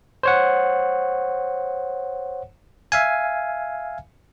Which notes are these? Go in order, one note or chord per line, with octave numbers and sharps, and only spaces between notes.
C5 C#5 F#5
E5 F5 G#5